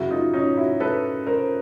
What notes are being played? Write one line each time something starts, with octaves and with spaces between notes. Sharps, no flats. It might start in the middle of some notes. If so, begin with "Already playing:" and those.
Already playing: F#2 C#3 F#3 E4 F#4
D#4 F4
C#4 D#4
E4 F#4
A4 B4
A#4 C5